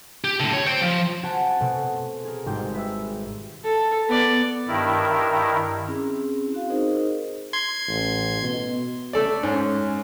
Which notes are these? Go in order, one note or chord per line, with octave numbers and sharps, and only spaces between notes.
G4
A2 D3
C#5
C5 G5
F3
C4 F#4 F#5 G#5 A5 B5
B2 A3 C4
G#4 A#4
G#1 G3 G#3 G5
B4 E5 E6
A4
B3 D5
G2 D#3 E4 A#4
C4 C#4 E4 G#4
C4 F#4 F5
D#4 G#4 A#4 C5 D#5
C6 G#6
A1
B2
A3 A4 D5
G#2 C#4